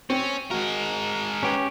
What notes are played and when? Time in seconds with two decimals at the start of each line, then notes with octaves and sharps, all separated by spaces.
0.10 C4 C#4
0.51 G#3 F#4 A#4
1.43 C#4 G4 B4